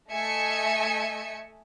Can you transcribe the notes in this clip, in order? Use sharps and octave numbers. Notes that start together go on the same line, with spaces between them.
A3 D#5 E5 G#5 C#7